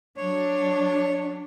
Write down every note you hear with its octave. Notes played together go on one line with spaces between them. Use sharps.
F#3 D4 C#5